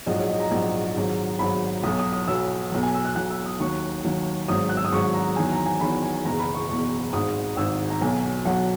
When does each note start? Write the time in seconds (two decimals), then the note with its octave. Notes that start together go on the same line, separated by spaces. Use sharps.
0.06 A#1 G#2 F#3 D#5
0.18 C#5
0.29 D#5
0.40 A#5
0.51 A#1 G#2 F#3
0.96 G#1 G#2 F#3
1.39 G#1 G#2 F#3 B5
1.83 B1 B2 F#3 D#6
1.99 D#6
2.13 D#6
2.28 B1 B2 F#3 E6
2.72 B1 B2 F#3
2.83 G#5
2.94 E6
3.05 F#6
3.15 B1 B2 F#3 F#6
3.30 E6
3.46 D#6
3.60 D#2 D#3 F#3 C#6
4.04 D#2 D#3 F#3
4.48 G#1 G#2 F#3 D#6
4.69 F#6
4.77 E6
4.85 D#6
4.92 G#1 G#2 F#3 C#6
5.14 A#5
5.36 E2 D#3 F#3 G#5
5.52 A#5
5.66 G#5
5.81 E2 D#3 F#3 B5
6.02 G#5
6.25 F#1 E2 B2 A#5
6.40 B5
6.54 C#6
6.69 F#1 E2 B2 C#6
7.13 G#1 G#2 D#3 D#6
7.57 G#1 G#2 D#3 E6
7.90 A#5
8.01 B1 B2 F#3 G#5
8.45 B1 B2 F#3 F#5